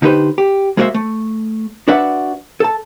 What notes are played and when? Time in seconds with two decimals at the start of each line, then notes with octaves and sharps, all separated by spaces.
0.02 D3 D#4 G4 B4 C5
0.38 G4
0.77 G#3 A#3 F#4 A#4 C5 E5
0.94 A3
1.88 D4 F#4 B4 D5 E5 F#5
2.60 A4 A5